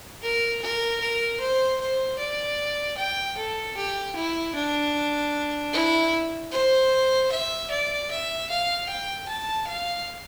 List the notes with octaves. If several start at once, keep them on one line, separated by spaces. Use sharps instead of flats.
A#4
A#4
A#4
C5
C5
D5
G5
A4
G4
E4
D4
E4
C5
E5
D5
E5
F5
G5
A5
F5